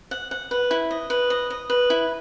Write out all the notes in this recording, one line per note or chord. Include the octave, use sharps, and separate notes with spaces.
F#5
F#5
B4
E4
D#5
B4
D#5
D#5
B4
E4